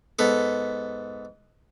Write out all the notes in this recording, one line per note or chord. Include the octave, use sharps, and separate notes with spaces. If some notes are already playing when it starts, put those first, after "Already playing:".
G#2 B3 A4